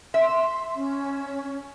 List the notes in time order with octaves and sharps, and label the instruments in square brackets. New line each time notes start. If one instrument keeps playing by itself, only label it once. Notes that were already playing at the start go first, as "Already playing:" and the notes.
[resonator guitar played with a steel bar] E5 [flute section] C6
[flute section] C#4